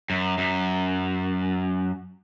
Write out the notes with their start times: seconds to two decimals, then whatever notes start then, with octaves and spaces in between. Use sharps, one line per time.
0.10 F#2
0.38 F#2